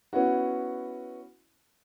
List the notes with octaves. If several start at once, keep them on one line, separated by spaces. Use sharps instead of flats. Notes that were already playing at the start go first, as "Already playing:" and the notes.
B3 C#4 E4 F#4